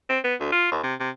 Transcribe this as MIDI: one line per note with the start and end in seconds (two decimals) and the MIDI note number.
0.10 0.19 60
0.24 0.34 59
0.40 0.51 38
0.52 0.69 65
0.71 0.82 39
0.83 0.94 48
1.00 1.09 48